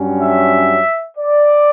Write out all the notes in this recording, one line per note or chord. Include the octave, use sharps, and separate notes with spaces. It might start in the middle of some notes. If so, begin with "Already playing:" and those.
Already playing: G2 F#3 C#4
E5
D5